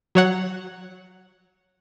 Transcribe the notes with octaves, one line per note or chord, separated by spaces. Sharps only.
F#3 C#5 F#5